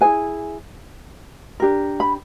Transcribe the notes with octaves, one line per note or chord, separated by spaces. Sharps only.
E4 G#4 B4 G#5
D4 G4 A#4
B5